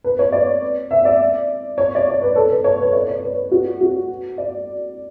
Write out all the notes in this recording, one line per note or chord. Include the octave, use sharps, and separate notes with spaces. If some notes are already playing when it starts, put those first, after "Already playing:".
B4
C#5
D5
E5
D5
C#5
D5
C#5
B4
A4
B4
C#5
B4
D5
C#5
B4
F#4
F#4
D5